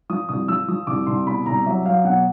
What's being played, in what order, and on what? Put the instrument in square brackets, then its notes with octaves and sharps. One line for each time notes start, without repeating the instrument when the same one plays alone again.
[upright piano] F3 D#6
C2 D#6
F3 E6
F3 D#6
C2 D6
C2 C6
B2 B5
C2 A#5
F#3 E5
F#3 F5
B2 F#5